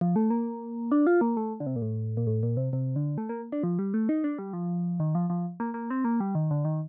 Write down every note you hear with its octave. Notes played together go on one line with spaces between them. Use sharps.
F3
A3
A#3
D4
F4
A#3
A3
D3
C3
A#2
A2
A#2
A2
A#2
C3
C3
D3
A3
A#3
D4
F3
G3
A3
D#4
D4
G3
F3
D#3
F3
F3
A#3
A#3
C4
A#3
G3
D#3
D3
D#3